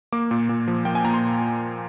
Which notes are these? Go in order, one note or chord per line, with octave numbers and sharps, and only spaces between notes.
A#3 D6
A#2
A#2
F3
A#3 G5
G#5
A#2 A#5
C6